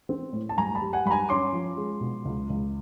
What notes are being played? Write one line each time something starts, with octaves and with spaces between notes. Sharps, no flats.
C4
A2
A5
G2 G#5 A#5
A5 B5
G3
F#5 G#5
G2 B5
G#5 A#5
C#4 C6 D6
F3
G#3
B2
C#2
C#2